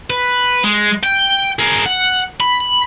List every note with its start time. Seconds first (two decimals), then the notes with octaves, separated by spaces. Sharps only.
0.10 B4
0.64 G#3
1.04 G5
1.59 G#4 A#4
1.86 F#5
2.40 B5